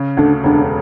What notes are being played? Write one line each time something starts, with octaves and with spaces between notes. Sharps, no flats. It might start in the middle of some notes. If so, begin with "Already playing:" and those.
Already playing: C#3
D2 D4
E1 D4